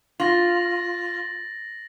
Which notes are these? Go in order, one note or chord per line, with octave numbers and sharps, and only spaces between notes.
F4 A6 A#6 F#7